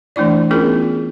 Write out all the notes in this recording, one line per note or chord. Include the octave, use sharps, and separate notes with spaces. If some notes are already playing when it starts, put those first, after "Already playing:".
E3 A3 D4 E4 D5
B3 C#4 E4 F4 G#4 A#4